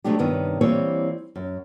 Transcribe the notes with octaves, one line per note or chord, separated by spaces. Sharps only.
C3 F#3 G#3 A3 D4 G4
G2 C3 D#3 B3 C#5
E3 G3 A#3 C4 C#5
F#2